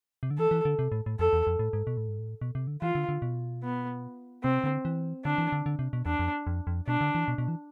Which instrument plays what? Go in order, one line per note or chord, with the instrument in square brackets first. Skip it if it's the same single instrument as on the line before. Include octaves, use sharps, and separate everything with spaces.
[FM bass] C3
D3
[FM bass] E3 [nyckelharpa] A4
[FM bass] E3
D3
C3
A2
A2
[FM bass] F2 [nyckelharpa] A4
[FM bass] E2
F2
A2
G#2
B2
A2
G#2
A2
B2
C3
D3
[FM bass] E3 [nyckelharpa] F4
[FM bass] D3
D3
B2
[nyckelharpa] B3
[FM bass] C3 [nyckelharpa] C4
[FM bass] D3
E3
[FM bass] D3 [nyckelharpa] D4
[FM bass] E3
D3
D3
C3
B2
[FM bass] E2 [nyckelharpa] D4
[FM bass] F2
F2
F2
[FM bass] B2 [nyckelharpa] D4
[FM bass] D3
E3
B2
B2
E3